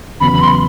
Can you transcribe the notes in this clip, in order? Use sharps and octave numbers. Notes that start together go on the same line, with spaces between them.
E2 C#3 F#3 B3 B5
B5
C6